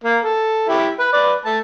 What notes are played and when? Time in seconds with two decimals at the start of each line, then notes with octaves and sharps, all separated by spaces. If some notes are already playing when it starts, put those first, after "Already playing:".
0.04 A#3
0.24 A4
0.69 E4 G4
1.00 B4
1.13 B4 D5
1.45 A3 A5